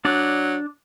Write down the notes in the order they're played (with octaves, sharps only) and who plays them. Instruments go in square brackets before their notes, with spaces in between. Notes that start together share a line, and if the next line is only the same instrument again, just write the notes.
[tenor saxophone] F#3 [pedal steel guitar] D4 D5